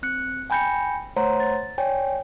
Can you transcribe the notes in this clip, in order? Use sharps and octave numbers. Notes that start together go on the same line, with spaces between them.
C4 F#6 C#7
G5 G#5 B5 G6 A#6 C#7
A3 C5 C#5 F#5 A#5 C6
A6
C#5 D5 G5 G#5